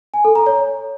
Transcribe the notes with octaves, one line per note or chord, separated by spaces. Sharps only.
G#5
A4
A#5
C#5